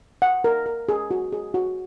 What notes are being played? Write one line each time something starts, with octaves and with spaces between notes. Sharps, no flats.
F#5
A#4
A#4
G#4
F#4
G#4
F#4